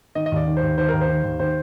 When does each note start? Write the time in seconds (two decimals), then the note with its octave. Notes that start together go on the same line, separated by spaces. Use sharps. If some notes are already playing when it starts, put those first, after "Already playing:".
0.15 D#3 D#5
0.26 D#5
0.32 D#2 D5
0.47 D#3
0.57 C5
0.63 D#2
0.78 D#3 C5
0.89 D#2 A#4
1.01 C5
1.08 D#3
1.24 D#2
1.39 D#3 C5